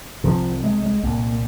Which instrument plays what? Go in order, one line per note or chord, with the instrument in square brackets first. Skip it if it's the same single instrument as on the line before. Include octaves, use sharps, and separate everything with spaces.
[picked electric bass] C2 C3 F3
G#3
G#3
C2 A#2 A#3